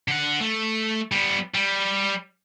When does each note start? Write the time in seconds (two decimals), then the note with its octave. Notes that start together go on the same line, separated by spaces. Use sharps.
0.08 D3 F#5
0.41 A3
1.12 G3 B3
1.54 G3